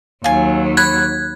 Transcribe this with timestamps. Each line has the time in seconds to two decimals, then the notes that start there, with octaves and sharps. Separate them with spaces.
0.24 D#2 F#3 F4 G#5
0.77 B5 F#6 G#6